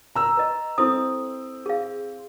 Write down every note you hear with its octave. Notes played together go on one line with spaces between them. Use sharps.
A#5 E6
B4 D#5
C4 E4 A4 D#6
G#4 F5